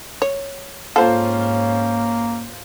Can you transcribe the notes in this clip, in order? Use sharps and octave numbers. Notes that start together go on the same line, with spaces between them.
C#5
G#2 A#3 C#4 F4 A4 C5